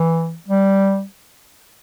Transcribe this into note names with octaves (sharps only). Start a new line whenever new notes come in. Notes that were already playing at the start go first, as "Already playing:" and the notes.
Already playing: E3
G3